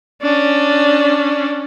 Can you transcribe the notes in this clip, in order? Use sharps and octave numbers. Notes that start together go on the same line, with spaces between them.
C#4 D4